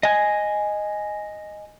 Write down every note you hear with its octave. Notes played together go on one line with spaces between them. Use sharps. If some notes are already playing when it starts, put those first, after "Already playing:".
D#5 G#5